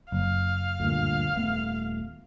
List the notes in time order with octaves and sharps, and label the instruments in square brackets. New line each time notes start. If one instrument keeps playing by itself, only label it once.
[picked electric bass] F#1 [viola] F5
[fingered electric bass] D2 G2 A#2
D#1 A3 B3